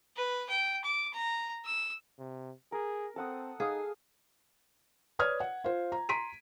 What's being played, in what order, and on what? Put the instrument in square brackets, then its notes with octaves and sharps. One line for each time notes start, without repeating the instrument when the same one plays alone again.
[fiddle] B4
G5
D6
A#5
E6
[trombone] C3
[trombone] G#4 [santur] A#4
[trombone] C4 [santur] A4 F#5 D#6
[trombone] D#4 [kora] G#4 [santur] F5 D#6
[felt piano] B4 C#5 D5 D#6 F6 G#6
F#5
F4 C5
A#5
A#5 C6 B6 D7 D#7